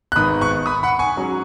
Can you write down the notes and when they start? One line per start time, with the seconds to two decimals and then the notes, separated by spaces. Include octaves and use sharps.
0.12 F#6
0.16 G#1 G#2 D#3 B3 D#4 B5 D#6
0.41 C#6 F#6
0.66 B5 D#6
0.83 F#5 B5
0.99 G#5 C#6
1.16 G#2 F#3 C#4